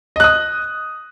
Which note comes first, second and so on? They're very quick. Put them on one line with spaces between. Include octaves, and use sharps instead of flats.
D#5 F#6 D#6